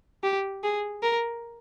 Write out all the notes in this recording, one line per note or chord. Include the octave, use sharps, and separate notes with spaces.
G4
G#4
A#4